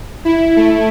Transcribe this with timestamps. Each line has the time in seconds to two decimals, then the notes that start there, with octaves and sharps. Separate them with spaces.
0.25 E4
0.56 A3